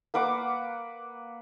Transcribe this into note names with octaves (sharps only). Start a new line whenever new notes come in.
A#3 B4 F#5 D6